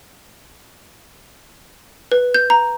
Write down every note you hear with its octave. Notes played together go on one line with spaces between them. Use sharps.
B4
G6
A#5